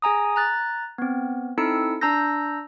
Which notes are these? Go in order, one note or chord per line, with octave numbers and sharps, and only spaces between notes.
G#4 G#5 A#5 D#6
A#5 F#6 A6
B3 C4
C4 D#4 E4 A4 E6 C#7
D4 A#5 E6 G6 A#6